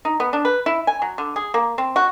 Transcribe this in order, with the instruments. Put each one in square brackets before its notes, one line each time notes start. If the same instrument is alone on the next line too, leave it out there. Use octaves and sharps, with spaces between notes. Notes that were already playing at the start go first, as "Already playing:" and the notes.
[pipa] D#4
B3
D4
B4
E4
G#5
F#3
D3
G#4
A#3
C4
F#4